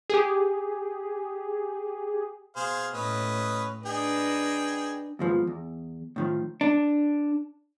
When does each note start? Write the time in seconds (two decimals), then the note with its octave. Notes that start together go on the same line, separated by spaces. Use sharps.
0.10 G4 G#4
2.56 B2 G#4 C5 F5
2.94 A2 C#4 B4 D#5
3.86 D4 D#4 G#4 B4 G5
5.19 D#2 G#2 F3 B3
5.47 E2
6.16 A2 D#3 F3
6.61 D4